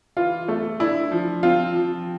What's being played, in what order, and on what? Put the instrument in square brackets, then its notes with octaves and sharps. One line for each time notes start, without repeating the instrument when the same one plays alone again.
[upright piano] E3 [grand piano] F4
[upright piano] A3
[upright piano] D4 [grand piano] E4
[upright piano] F3
[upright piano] C4 [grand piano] F4
[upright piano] F3